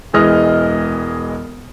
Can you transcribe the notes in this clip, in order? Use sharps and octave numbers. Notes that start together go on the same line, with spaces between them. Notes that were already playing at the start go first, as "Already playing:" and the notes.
E1 E3 G#3 D#5 F6